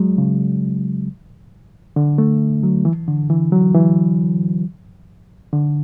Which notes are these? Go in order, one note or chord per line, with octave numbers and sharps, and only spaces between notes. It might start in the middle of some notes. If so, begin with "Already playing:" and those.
Already playing: F#3 G#3
C#3
D3
A3
F#3
E3
D3
E3
F#3
E3
D3